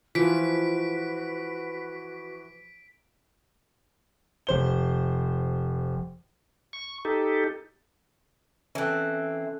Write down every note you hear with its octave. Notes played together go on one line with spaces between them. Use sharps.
E3 F3 F#4 B4 B6 D7
F1 C5 G7
C#6
D#4 G4 A4
E3 C4 C#4 A4 F#6